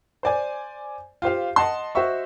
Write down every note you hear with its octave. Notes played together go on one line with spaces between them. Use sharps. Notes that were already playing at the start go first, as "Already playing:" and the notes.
C5 D5 G#5
F4 G4 C5 F5
D#5 F#5 A5 C6
F#4 C5 D#5 E5 C#6